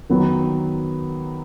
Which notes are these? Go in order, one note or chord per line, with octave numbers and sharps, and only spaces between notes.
D#3 F#3 B3 D#4